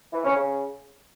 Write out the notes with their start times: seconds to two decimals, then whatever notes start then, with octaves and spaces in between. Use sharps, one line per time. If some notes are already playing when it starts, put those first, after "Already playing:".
0.13 E3
0.25 C#4
0.36 C#3